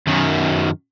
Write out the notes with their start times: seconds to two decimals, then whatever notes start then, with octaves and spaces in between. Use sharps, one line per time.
0.08 F#2 D#3